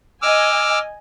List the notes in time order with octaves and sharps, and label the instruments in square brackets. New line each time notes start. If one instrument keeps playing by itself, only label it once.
[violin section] D#5 G#5 [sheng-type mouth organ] D6 E6 F6